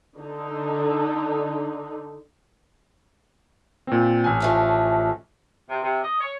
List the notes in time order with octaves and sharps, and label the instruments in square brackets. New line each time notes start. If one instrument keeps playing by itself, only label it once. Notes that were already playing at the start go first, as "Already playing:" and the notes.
[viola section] D3 D#4
[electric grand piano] A#2 C4
A1 G#5
[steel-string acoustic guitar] F3 A3 C#4
[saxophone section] C3
C3
D#5
C#5